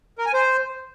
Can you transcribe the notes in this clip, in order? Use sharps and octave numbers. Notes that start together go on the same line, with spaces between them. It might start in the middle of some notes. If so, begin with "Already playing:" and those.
A#4
G#5
C5